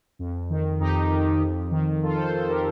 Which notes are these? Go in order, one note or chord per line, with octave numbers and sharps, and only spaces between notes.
F2
D#3
F2 D#4 G4
D#3
F2
D#3
F2 F4 A4
A4 C5
D#3 A4 C5
G4 A#4